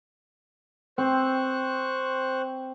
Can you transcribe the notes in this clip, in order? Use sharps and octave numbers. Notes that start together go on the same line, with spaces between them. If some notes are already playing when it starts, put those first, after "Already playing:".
C4 C5 C#6 F#6